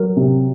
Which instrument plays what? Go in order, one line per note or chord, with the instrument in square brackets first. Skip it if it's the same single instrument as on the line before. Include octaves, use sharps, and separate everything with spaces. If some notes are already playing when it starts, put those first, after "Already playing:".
Already playing: [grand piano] F#3 [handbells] A#4
[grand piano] C3